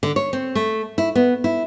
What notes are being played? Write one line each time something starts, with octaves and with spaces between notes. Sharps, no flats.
D3
C#5
C4
A3
E4
B3
E4